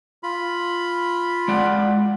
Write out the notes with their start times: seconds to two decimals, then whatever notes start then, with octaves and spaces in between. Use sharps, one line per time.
0.23 F4 B5
1.48 G#3 D5 F#5